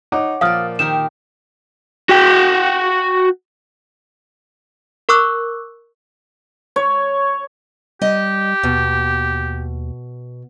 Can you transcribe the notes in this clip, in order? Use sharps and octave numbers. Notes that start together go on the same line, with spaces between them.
D#4 C#5 F#5 D6
A#2 F3 D5 F5 D#6 F6
D#3 G4 A#4 E7
F#4 G5
A#4 C#6 D6 E6 F#6
C#5
G3 G4 D#5
D#2 B2